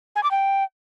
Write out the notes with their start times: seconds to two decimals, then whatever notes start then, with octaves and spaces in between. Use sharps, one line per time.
0.16 G#5
0.23 D6
0.31 G5